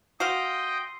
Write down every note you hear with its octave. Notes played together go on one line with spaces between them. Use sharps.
F#4 D#5 F5 G5 C6 E6 C7